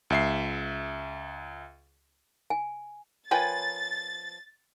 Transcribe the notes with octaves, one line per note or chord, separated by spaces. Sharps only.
C#2 E5 C7
G#5
F3 A#4 B4 C#5 G5 G#5 A6